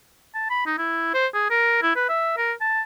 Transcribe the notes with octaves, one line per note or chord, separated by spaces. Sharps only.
A5
B5
D#4
E4
C5
G#4
A#4
E4
B4
E5
A#4
A5